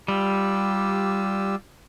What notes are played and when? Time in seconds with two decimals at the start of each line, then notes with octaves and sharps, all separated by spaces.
0.08 G3 F4 G4 E6